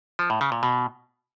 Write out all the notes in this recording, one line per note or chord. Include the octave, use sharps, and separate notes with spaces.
F3
A2
C#3
A#2
B2